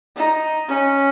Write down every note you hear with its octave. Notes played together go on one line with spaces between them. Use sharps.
D#4
C#4